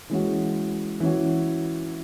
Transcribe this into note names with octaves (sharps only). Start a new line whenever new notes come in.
E3 G#3 C#4 F#4
E3 C#4 F#4